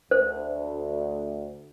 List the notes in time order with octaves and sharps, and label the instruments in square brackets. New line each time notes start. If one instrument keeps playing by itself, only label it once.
[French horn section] D2 [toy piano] C5